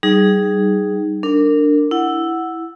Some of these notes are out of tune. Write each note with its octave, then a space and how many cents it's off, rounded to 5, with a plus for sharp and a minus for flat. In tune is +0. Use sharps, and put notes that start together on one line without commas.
G3 -25 D#4 +0 G#4 +0
D4 +0 A#4 -25
E4 +0 F#5 +0